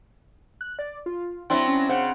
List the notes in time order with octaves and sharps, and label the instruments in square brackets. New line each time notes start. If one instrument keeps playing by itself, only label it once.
[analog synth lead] F#6
D5
F4
[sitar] F#3 D4 E4 [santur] C4
[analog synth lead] C#4
[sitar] C#3 [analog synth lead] C5 [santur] F#5